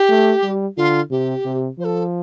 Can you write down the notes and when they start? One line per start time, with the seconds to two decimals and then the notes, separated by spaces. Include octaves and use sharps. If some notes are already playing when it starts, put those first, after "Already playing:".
Already playing: G4
0.09 A3
0.43 G3
0.77 D3 F4
1.11 C3 G4
1.45 C3
1.79 F3 C5
1.84 A4